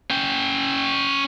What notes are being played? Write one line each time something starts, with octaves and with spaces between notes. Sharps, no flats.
C#4 G5